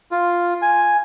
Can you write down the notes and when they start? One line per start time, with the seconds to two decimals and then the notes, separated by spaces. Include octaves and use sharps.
0.12 F4
0.62 G#5